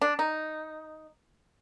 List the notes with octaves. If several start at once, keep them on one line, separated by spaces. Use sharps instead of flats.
D4
D#4